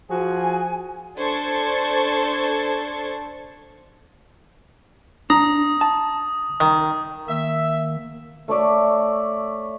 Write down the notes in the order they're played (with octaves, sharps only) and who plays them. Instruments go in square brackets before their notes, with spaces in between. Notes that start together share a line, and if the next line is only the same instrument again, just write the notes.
[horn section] F3 F#4 G#4 [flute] G#5
[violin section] D4 A4 C5 C#6 G#6 A6
[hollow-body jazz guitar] D4 [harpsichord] A#5 [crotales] D#6
[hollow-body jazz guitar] A5
[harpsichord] D#3
[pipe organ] D#3 A#3 [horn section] E5
[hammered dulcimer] A3 C#5 D5 E5